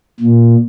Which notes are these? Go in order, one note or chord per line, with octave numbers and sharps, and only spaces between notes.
A#2